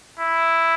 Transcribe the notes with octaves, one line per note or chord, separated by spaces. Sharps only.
E4